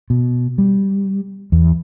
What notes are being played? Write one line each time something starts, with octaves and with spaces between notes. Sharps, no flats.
B2
G3
E2